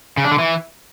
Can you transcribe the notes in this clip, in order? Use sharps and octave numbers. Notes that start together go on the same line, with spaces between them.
C#3
D4
D3
E3